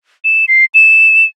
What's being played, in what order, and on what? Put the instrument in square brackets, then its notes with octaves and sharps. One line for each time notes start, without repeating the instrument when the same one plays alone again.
[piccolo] E7
C7
E7